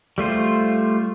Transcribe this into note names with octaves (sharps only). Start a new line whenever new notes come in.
G3 A3 F4 C5